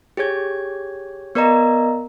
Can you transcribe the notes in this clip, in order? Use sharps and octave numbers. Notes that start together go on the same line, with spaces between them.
G4 G#4 C#5 G#6
B3 A#4 D5 D#5 A#5